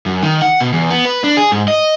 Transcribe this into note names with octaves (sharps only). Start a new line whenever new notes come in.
F#2
D#3
F#5
B2
E2
B3
B4
D4
G#4
G#2
D#5